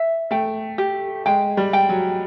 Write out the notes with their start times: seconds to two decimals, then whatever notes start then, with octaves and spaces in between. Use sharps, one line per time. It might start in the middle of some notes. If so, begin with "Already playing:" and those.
Already playing: E5
0.31 A3 G5
0.78 G4
1.26 G#3 G5
1.57 G3
1.73 G5
1.89 F#3